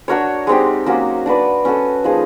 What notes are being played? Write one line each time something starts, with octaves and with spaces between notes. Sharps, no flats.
D4 F#4 A#4 C#5
G#3 C4 D#4 G4
F#3 A#3 C#4 F#4
D4 F#4 B4 D5
C#4 F#4 A4
F3 A#3 D#4 G#4